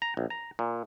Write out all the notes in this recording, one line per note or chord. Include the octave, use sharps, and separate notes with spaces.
A#5
A#1
A#5
A#2